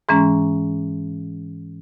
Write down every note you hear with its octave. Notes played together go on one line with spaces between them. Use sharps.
G#2 E3 G#3 C#4 A#5